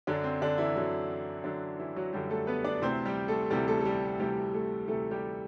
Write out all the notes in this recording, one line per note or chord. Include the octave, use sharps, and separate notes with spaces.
F#2 D3 F#3 D4
C4
D3 D4
E3 E4
F#2 D3 F#3
F#2 D3 F#3 D4
E3 E4
F#3 F#4
F#2 D3 F#3 G3 G4
A3 A4
B3 B4
D4 D5
D2 C3 E3 C4 C5
G3 G4
A3 A4
D2 C3 E3 G3 G4
A3 A4
A4
G3 G4
D2 C3 E3 G3 G4
A3 A4
D2 C3 E3 A3 A4
G3 G4